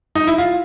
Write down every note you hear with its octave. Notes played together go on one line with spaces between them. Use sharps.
D#4
E4
F4